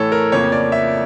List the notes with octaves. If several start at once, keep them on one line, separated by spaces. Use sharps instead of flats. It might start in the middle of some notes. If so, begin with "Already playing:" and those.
Already playing: A2 E3 A3 A4 C#5
A#4
F2 C#3 F3 A#3 C#5
D5
E5